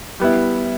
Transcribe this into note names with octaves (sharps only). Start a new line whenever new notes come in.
G3 B3 E4